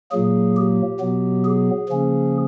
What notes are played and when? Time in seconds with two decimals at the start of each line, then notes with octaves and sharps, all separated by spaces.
0.11 A#2 F#3 A#3 G#4
0.56 G4
1.00 B2 F#3 B3
1.45 G#4
1.88 C#3 F3 A#3 C#4